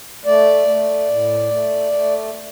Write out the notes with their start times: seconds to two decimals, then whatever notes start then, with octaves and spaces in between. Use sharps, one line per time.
0.25 A3 D5
0.67 A3
1.09 A2
1.51 A3
1.92 A3